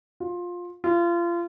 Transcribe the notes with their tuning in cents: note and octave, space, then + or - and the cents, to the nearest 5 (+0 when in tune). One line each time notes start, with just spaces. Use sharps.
F4 +15
F4 -30